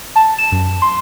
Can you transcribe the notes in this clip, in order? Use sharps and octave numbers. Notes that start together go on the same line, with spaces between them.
A5
E7
F#2
C6